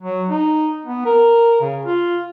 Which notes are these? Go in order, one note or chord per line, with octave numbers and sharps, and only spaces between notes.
F#3
D#4
B3
A#4
C#3
F4